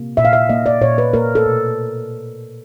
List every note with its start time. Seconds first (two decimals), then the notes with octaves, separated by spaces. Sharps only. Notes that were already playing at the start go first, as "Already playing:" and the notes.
Already playing: C3 A#3
0.17 A#2 E5
0.25 F5
0.33 E5
0.49 A#3 D#5
0.66 D5
0.82 A#2 C#5
0.98 B4
1.14 A#3 A#4
1.35 A4
1.46 B2